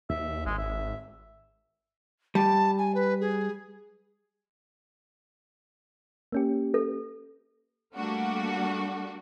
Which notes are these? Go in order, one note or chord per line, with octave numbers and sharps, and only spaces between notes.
D#2 E5
G#1 G#3
E5
G3 A5
G#5
B4
G#4
A#3 C#4 G4
A4
G3 A3 A#3 D4 F#4